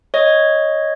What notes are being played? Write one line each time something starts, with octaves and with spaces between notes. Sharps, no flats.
C#5 D#5